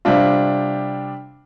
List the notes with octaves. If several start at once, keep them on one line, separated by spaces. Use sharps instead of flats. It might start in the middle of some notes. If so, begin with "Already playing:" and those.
C3 G3 D4 F4